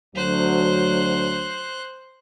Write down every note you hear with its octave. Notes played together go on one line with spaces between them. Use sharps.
D2 F#3 C5 F#6